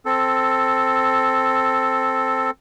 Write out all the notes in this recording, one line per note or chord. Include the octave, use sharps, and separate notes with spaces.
C4 A4